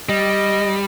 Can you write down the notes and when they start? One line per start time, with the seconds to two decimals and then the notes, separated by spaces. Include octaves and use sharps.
0.09 G3 D#5